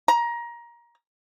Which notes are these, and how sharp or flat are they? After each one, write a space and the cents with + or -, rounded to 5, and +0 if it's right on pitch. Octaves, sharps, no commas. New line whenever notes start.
A#5 +20